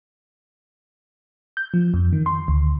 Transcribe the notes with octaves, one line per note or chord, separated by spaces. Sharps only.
G6
F3
F2
D#3
C6
D2